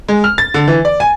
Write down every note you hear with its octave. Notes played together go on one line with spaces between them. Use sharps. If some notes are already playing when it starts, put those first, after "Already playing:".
G#3
F6
A6
D3
E3
D5
G#5